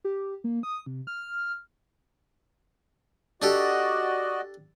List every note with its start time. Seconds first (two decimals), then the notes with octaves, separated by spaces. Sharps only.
0.05 G4
0.44 A#3
0.63 D#6
0.86 C3
1.07 F6
3.42 D4 F#4 G4 A4 D5 D#5